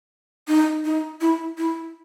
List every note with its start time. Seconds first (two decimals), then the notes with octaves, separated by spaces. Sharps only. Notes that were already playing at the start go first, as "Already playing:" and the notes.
0.48 D#4
0.85 D#4
1.21 E4
1.58 E4